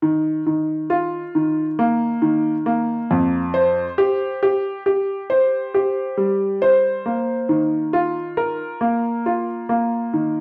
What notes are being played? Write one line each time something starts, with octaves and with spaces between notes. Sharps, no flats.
D#3
D#3
F4
D#3
A#3
D#3
A#3
F2
C5
G4
G4
G4
C5
G4
G3
C5
A#3
D#3
F4
A#4
A#3
F4
A#3
D#3